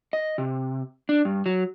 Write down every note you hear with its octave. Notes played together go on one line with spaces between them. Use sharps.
D#5
C3
D4
G2
F#3